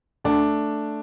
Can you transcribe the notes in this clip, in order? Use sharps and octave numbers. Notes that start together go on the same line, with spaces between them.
D2 D3 A3 D4